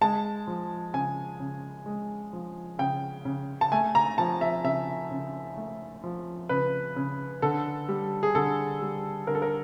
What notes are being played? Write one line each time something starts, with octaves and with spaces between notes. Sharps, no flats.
G#3 A5
F3
C#3 G#5
C#3
G#3
F3
C#3 G5
C#3
A5
A3 G#5
A#5
F3 A5
E5
C#3 E5
C#3
A3
F3
C#3 B4
C#3
D3 A4
G3
G#4
D3 A4
G3
D3 A#4
A4
A#4